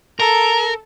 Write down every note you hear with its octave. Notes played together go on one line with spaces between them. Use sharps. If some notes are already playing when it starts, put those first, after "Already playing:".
A4 A#4 A#5